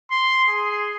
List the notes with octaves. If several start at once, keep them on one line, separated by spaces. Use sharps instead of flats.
C6
G#4